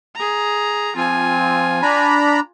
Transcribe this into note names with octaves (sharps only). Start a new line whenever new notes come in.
G#4 A#5
F3 C4 F4 G#5
D4 A#5 B5